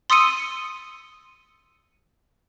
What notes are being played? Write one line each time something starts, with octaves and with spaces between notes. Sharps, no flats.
C6 D#6 E6 C#7 D#7